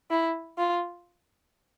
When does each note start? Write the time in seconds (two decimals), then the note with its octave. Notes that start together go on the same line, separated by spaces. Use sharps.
0.10 E4
0.58 F4